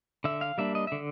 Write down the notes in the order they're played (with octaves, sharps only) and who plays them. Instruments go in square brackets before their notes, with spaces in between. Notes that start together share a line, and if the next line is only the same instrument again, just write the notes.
[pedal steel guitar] D3 E5
F5
G3 A#3 D4 E5
D#5
D3 E5